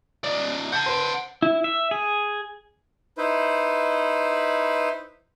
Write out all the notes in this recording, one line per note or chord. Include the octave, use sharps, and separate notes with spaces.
D#4 D5
F#5 A5 G6
B4 C5
E4
E5
G#4
D#4 E4 B4 C5